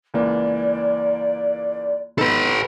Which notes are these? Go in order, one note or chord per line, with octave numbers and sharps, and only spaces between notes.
C#2 E3 A#3 D5
B3 D#4 A4 B4